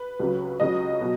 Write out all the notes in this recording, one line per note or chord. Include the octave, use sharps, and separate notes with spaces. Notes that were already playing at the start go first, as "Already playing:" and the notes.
Already playing: B4
C#2 C#3 F#3
C#2 C#3 F#3 D#5
B2 F#3